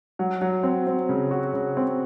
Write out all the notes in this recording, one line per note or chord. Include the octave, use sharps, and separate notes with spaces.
F#3
F#3
C4
C4
C#3
F#4
C#3
C4